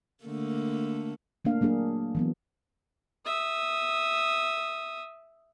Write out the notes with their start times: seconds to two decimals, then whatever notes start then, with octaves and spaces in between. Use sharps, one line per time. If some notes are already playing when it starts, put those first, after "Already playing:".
0.24 D3 A3 A#3
1.45 A3 A#3 D4 F5
1.61 F#3 A#3 D4 G#4
2.15 E3 F#3 B3
3.25 E5 D#6